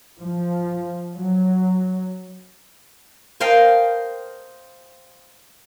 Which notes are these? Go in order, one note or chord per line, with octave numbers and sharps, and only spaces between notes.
F3
F#3
A#4 C5 D#5 F5 G5 A5